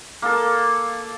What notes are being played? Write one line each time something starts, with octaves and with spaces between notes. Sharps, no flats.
A#3 A4